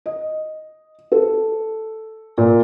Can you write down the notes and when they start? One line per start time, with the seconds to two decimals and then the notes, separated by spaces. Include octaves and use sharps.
0.06 D#5
1.12 A4
2.38 A#2